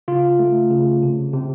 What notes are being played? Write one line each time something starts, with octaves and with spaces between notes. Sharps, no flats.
C#3 F4
A3
C#3
C3
C3